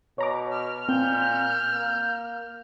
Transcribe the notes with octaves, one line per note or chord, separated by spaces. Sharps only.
B2 C#5 A#5 D6
F6
A#2 C4 G6
A#3